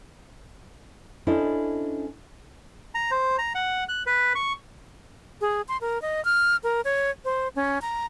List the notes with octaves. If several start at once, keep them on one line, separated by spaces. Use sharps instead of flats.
C#4 D4 E4 A4 C5 D#5
A#5
C5
A#5
F#5
F#6
B4
C#6
G#4
C6
A#4
D#5
F6
A#4
C#5
C5
C#4
A#5